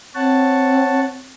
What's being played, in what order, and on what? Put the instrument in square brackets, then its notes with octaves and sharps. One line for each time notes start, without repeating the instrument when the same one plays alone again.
[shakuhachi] C4 [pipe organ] C#5 F#5 A5